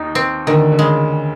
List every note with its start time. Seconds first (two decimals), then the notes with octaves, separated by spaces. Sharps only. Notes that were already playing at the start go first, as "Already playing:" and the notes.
Already playing: D#2 D#3 D#4
0.15 C4
0.47 D2 D3 D#3
0.72 D3
0.79 C#3 G#3